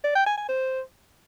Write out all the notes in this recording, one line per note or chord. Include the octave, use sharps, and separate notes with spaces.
D5
G5
G#5
G#5
C5